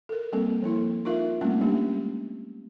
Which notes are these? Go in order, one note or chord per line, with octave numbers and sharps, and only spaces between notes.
A4 A#4
G3 A#3 C4 A4
F3 A#3 E4 C6
D#4 F4 A#4 E5 F5
G3 A3 A#3 C4 C#4 D#4
G3 G#3 A#3 C#4 D4 G4